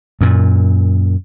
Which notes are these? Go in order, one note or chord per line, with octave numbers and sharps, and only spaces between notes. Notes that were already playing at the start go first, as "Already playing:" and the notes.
F#2 A#2